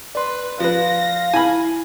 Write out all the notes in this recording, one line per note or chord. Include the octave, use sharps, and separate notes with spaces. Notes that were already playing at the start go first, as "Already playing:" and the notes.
B4 D5 C6
F3 B4 F5 A#6
E4 G#5 B5